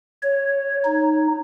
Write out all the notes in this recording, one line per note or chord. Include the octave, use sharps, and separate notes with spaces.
C#5
D#4